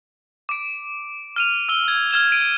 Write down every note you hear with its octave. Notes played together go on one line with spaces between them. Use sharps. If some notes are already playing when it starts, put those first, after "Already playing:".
D6 D7
F6 D#7 F7
E6 G7
G#6
F6 G#6 E7 G7
D7 D#7